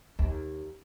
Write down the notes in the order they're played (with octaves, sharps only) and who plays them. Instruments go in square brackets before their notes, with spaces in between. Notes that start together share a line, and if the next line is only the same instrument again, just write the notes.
[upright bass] D#2